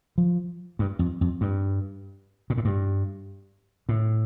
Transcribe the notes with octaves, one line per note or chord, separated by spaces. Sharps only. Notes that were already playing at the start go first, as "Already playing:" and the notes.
F3
G2
F2
F2
G2
A#2
A2
G2
A2